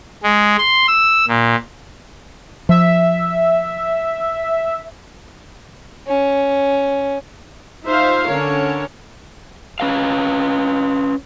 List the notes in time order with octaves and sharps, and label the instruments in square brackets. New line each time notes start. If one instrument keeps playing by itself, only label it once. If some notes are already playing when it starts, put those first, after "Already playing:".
[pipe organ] G#3
C6
E6
A#2
[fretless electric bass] F3 [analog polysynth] E5
[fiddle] C#4
[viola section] D#4 F4 C5 E5 F5
D3 C#4 A#4 C#5
[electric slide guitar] C#4 B4 F5